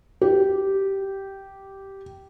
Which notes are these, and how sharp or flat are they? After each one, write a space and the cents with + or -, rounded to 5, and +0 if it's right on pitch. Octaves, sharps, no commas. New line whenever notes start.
G4 -10